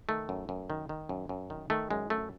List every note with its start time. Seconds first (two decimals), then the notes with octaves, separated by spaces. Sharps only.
0.09 D#3 A3
0.29 F#2
0.49 F#2
0.70 D#3
0.89 D#3
1.09 F#2
1.29 F#2
1.50 D#3
1.70 D#3 A3
1.90 F#2 G#3
2.10 F#2 A3